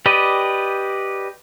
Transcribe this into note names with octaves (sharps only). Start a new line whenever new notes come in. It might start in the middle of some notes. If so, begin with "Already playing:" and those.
G4 B4 D5 D#5